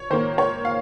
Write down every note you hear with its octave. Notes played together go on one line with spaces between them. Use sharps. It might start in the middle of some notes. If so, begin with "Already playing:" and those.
Already playing: C#5
D#3 A#3 C5
C#5
F5